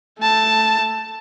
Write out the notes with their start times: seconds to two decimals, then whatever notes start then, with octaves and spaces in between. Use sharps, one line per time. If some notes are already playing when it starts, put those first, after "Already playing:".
0.19 A3 A5